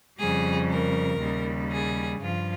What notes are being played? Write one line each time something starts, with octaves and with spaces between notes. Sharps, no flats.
F2 C#3 G3 G#4
A#4
D#2 C#3 G3
G#4
G2 F3 F4